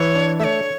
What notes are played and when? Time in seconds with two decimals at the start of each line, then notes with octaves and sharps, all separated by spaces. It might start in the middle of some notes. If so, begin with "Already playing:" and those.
Already playing: E3 C#5
0.15 D4
0.40 A3 C#5 E5